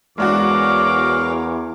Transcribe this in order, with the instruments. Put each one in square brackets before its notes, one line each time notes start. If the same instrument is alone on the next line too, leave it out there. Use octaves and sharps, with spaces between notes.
[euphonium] E2 [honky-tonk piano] G#3 D4 F#4 [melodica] A#4 C#5 F5 [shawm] D6